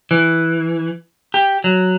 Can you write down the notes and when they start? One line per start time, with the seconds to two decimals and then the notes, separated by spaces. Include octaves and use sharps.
0.11 E3
1.34 G4
1.64 F#3